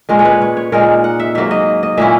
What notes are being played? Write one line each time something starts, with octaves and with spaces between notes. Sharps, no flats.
A#2 G#3 C#4 A#4
C#5
B4
C#5
C#5
A#2 G#3 D#4 A#4
F#5
E5
G#2 F#3 A#3 E5
D#5
D#5
A#2 A#3 C#4 E4 E5